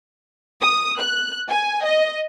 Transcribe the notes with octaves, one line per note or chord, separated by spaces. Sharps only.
D#6
F#6
G#5
D#5